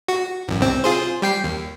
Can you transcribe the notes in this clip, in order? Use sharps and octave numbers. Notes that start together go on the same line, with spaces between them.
F#4
A1 F#2
C2 C4
F4 G#4 C5
G3 G5 C7
D#2